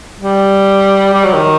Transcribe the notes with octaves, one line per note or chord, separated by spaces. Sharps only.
G3
G3
F#3
D#3